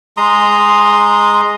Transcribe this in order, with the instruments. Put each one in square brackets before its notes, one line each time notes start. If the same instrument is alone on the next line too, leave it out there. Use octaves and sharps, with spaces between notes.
[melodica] G#3 A#5 C6 D#6